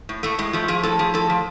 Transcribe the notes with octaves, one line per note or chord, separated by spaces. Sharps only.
A2
A2 A3
A2 G#3
F3 A3
F3 G#4
A2 A4
F3 G#4
A2 A4
F3